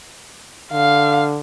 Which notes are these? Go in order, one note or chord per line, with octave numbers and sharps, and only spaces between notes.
D3 F5